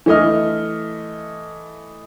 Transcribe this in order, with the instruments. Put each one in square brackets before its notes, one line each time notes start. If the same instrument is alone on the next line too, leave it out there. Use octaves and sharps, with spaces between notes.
[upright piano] E3 A3 D#5 F6